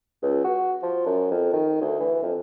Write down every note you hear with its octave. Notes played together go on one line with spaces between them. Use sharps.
C#2
F#4
F3
F#2
F2
D#3
D2
E3
F2